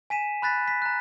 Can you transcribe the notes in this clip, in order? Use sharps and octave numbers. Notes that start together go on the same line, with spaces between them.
G#5 B6 D#7 E7
B5 F#6 A6 B6
B6
A#5 F#6